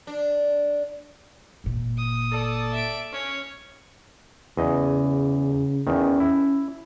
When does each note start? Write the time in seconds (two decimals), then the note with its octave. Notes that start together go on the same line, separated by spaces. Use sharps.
0.07 D4
1.64 G1 A#2
1.98 D#6
2.32 A4 D5 A5
2.73 E5 D7
3.13 C#4 C#5
4.57 E2 C#3 D#5
5.87 E2 D#3 C#4
6.20 E4